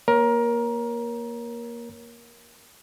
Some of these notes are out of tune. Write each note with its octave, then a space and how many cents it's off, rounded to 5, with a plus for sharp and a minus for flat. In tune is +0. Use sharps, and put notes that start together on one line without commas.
A#3 +15 A#4 +20 C#5 +0